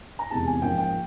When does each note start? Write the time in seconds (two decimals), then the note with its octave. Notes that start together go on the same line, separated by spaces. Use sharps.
0.19 A#5
0.30 E2 C3 D#3 G#3 A5
0.46 G#5
0.62 G#2 F3 A#3 C#4 G5
0.78 G5